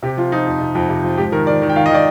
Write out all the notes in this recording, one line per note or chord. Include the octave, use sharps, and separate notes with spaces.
C3 G4
F3 F4
F3 D#4
F2
C3
F2
C3
F3
G#2 G4
D#3 A#4
D#3 D5
D#3
G5
D#3 F5
D#5
D#3 D5